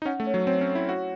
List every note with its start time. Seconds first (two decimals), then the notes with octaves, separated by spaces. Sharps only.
0.02 D#4
0.05 C#4 F#5
0.20 A3
0.27 C#5
0.34 F#3
0.47 C4 C#5
0.61 C#4
0.68 C#5
0.75 E4
0.89 F#4 F#5